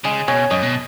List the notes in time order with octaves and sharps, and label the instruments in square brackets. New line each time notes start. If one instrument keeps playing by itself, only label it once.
[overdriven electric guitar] C#3 [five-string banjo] G#3
[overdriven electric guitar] B2 [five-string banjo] C#4
[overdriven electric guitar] F#2 [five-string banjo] D#5
[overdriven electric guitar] B2